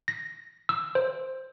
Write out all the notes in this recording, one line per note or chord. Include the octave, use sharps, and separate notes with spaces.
A#6
E6
C5